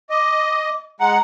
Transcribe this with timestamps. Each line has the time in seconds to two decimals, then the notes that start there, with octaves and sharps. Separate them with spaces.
0.10 D#5 D6
1.00 G#3 F#5 A#5